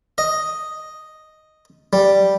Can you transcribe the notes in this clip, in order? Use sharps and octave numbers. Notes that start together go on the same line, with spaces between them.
D#5
G3